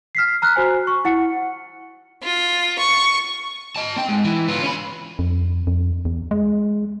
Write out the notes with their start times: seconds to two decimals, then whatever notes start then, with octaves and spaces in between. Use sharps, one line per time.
0.15 F6 B6 C7
0.42 A#5 F6 F#6
0.56 F#4 C5 G#5
0.87 C#6
1.05 E4 F#5 C#7
2.23 F4
2.79 C#6
3.76 D#5 A5
3.97 C4 G5
4.09 G#2
4.25 E3
4.48 B3 F4
4.63 C#4 B5
5.19 F2
5.67 F2
6.05 E2
6.31 G#3